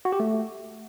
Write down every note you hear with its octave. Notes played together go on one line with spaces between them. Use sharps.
F#4
G4
A3